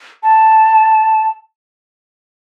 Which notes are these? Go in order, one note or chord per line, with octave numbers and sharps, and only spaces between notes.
A5